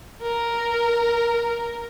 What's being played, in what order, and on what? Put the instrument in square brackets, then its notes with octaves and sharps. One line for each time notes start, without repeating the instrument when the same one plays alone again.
[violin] A#4